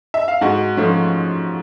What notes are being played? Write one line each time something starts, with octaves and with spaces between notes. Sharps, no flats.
E5
F5
G#2 F#4 F#5
F3 A3 C#4